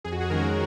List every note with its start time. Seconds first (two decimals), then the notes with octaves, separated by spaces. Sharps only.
0.04 F2 G#4
0.12 F#4
0.21 G#4
0.30 D#3 G#3 C#4 F#4 A#4